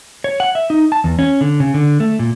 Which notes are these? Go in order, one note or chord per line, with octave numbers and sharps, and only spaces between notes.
C#5
F#5
E5
D#4
A5
E2
C#4
D3
C#3
D3
A3
A#2